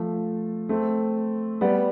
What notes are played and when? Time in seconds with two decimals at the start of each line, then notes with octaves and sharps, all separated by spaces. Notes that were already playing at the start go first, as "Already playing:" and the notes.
Already playing: F3 A3
0.69 A3 C4
1.61 G3 B3